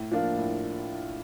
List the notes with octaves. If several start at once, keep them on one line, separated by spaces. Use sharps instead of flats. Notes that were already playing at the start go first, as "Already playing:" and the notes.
Already playing: A2
F3 A#3 D4 F4
A2